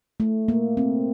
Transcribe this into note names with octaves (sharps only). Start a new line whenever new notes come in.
A3
A#3
C4